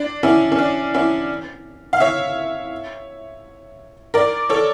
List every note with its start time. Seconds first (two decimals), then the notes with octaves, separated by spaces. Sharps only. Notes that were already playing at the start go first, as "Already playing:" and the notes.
Already playing: D4
0.23 C#4 E4
0.52 C#4
0.58 D4
0.94 C#4 E4
1.93 F5
2.00 C#5 E5
4.14 A#4 D5
4.49 A4 C#5